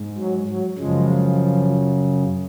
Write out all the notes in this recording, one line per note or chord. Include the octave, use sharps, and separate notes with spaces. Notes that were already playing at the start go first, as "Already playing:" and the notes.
Already playing: G#2
F#3
F#3
F#2 C#3 F3 G#3